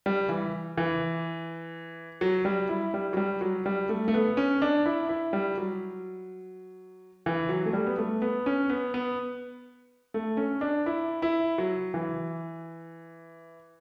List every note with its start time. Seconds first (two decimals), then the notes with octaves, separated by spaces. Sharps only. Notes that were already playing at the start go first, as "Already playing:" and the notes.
0.06 G3
0.29 E3
0.77 E3
2.21 F#3
2.45 G3
2.69 E4
2.94 G3
3.13 F#3
3.17 G3
3.41 F#3
3.66 G3
3.89 A3
4.08 A3
4.14 B3
4.37 C#4
4.62 D4
4.86 E4
5.09 E4
5.33 G3
5.58 F#3
7.26 E3
7.49 F#3
7.66 A3
7.73 G3
7.86 B3
7.98 A3
8.22 B3
8.46 C#4
8.70 B3
8.94 B3
10.14 A3
10.37 C#4
10.61 D4
10.86 E4
11.22 E4
11.58 F#3
11.94 E3